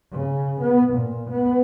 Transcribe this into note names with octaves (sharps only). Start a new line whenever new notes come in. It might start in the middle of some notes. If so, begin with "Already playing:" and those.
C#3
B3
A#2
B3